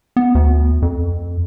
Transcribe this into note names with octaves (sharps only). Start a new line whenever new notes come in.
B3
D2
F2